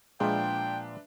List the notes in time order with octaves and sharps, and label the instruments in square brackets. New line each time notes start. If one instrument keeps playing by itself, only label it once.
[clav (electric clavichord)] A#2 F3 [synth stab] G#3 [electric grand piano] D4 B4 E5 [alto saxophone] G5